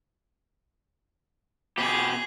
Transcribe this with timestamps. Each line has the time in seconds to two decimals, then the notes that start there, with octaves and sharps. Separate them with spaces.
1.78 B2 G4 G#4